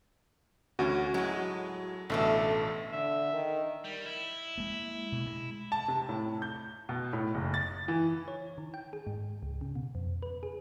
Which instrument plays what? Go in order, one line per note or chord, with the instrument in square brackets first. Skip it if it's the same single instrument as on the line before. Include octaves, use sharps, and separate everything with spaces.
[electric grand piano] D2 C#4 [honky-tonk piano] F#4
[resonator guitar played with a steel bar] A2 G#3 [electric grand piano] F#3
[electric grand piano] A1 B2 [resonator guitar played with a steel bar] D3 A3 A4
[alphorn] D3 [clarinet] E5
[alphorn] D#3
[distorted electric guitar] G3
E4
[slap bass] G#3 A#3
B2
G#3
[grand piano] A5
C3
A2
G6
B2
A2
F#1
A6
E3
[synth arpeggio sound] C#5
D#3
G5
G#4
G#2
C#2
C#3
B2
F2
B4
G#4